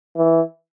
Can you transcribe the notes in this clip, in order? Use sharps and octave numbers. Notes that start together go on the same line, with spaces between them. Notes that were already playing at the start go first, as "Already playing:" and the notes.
E3